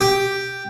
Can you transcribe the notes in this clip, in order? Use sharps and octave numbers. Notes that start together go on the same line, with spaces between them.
G4